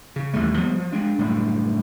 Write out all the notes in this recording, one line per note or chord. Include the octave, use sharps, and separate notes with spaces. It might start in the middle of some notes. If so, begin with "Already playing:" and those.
C#3
A1 D#2 G3 A3
F3 G3 G#3 B3
F3
G#3 D4
F#1 A2 G3 D4